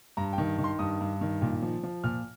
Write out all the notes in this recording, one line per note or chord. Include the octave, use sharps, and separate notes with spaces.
G2 A#5
G5
D#3
D#3
C6
G2 D#6
G2
D#3
A#2
F3
F3
A#2 F6